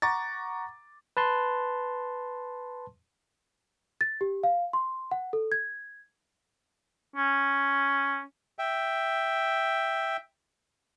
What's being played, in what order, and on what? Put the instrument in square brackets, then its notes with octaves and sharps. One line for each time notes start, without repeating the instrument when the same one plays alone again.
[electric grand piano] F#5 A#5 C#6 D6 A6
[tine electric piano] B4 A5 C6
[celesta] A6
G4
F5
C6
F#5
A4
G#6
[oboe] C#4
[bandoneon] E5 G5